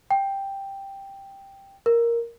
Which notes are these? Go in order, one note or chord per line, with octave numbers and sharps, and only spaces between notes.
G5
A#4